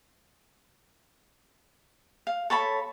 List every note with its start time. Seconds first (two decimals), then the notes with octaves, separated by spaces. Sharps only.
2.27 F5
2.50 A4 C#5 A5 B5